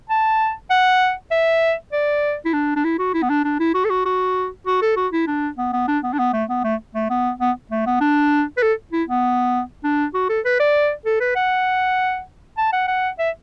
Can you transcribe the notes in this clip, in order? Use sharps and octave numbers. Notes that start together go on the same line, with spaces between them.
A5
F#5
E5
D5
E4
D4
D4
E4
F#4
E4
B3
D4
D4
E4
F#4
A4
F#4
F#4
F#4
A4
F#4
E4
D4
B3
B3
D4
B3
D4
B3
A3
B3
A3
A3
B3
B3
A3
B3
D4
B4
A4
E4
B3
D4
F#4
A4
B4
D5
A4
B4
F#5
A5
F#5
F#5
E5